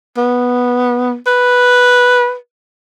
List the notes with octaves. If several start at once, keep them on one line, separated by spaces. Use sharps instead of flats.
B3
B4